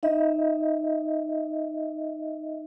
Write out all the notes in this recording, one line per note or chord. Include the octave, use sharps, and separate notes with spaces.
D#4 D#5 E5